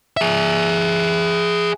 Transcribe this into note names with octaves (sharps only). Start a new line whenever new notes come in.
G#4 E5